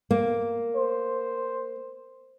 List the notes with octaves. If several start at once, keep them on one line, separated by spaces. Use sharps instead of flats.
A#3
C5